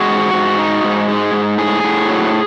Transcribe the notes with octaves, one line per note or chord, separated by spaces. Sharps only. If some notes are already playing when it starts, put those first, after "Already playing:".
Already playing: G#3 F#4
G#2
G#2
D#4
G#2
G#3
G#2
A2 G#4
A2
F#3